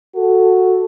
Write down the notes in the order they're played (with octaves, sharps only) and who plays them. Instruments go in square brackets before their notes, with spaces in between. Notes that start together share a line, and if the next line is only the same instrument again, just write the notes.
[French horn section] F#4 A4